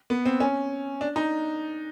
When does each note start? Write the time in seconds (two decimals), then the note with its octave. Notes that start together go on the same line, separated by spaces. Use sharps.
0.10 B3
0.26 C4
0.40 C#4
1.01 D4
1.16 D#4